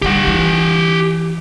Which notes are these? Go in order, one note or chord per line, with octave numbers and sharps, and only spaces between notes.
D3 G3 G4 F#5
E3